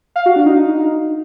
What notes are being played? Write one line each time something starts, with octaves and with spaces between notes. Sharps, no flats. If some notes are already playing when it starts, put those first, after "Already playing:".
F5
F#4
D4
D#4